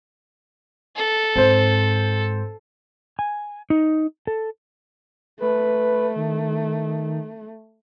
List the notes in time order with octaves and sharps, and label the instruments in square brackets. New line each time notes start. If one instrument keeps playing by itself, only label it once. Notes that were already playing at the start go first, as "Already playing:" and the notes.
[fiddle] A4
[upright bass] G#2 [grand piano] C4 C5
[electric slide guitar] G#5
D#4
A4
[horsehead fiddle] A3 [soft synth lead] B4
[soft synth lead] D#3